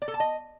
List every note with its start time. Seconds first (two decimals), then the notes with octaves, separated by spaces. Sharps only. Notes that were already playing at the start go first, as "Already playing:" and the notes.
0.02 D5
0.08 A4
0.14 A5
0.20 D#5